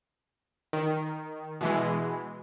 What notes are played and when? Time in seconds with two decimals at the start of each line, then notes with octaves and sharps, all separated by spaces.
0.73 D#3
1.61 B2 E3 G#3